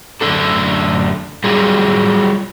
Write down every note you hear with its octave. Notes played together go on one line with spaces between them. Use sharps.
F#2 D3 A3 D4 A4
F#3 G3 F4 G#4